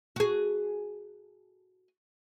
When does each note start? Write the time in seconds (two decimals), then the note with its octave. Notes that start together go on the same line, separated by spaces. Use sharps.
0.16 F#4 G#4